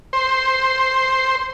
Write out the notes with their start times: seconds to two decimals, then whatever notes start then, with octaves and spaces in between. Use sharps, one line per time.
0.13 C5